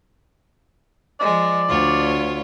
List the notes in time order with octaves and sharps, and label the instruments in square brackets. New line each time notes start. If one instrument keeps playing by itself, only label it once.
[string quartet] F3 G#3 [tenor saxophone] D5
[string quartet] D2 F4 C#5